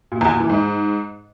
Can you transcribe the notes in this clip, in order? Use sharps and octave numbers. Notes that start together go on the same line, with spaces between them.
A#2
E2
A#2
E3
G#2